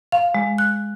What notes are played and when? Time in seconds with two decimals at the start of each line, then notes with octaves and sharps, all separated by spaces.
0.12 F5
0.35 G#3
0.58 F#6